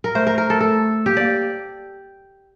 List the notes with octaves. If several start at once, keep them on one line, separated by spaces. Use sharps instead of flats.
A#4
A3 C5
A#4
A#4
A4
A4
A#3 G4
A#3 D5